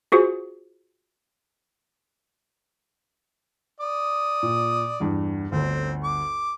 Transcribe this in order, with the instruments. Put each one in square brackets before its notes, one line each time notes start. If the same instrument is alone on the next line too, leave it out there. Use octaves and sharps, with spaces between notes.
[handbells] F4 F#4 G#4 C5
[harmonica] D5 D#6
[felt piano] A#2
E2 G2
[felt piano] G1 D2 [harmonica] C4
[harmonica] D6